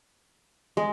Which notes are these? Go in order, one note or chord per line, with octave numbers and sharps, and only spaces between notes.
G#3